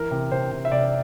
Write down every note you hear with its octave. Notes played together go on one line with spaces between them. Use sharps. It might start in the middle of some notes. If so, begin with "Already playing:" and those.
Already playing: E3 A#4
C3
C3 C5
C3
E5
C3 D5